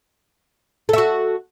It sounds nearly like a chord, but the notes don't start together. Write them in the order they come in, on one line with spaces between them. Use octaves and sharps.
A4 E5 F#4